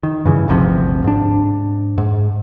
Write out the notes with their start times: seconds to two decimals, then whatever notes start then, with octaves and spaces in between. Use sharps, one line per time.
0.03 D#3
0.25 G2 C#3 E3
0.48 G1 D2 C3 F3
1.04 G#2 D4
1.98 G#2